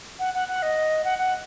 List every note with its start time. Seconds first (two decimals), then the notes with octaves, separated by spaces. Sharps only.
0.19 F#5
0.34 F#5
0.48 F#5
0.62 D#5
1.04 F#5
1.19 F#5